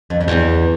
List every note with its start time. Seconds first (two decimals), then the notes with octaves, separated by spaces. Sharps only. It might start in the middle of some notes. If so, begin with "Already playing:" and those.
0.10 F2
0.21 F2
0.28 E2